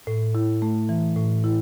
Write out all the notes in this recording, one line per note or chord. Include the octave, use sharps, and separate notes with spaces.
A2
E4
A3
E3
A2
E4